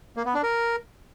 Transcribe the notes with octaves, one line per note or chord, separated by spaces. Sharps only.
A#3
B3
D4
A#4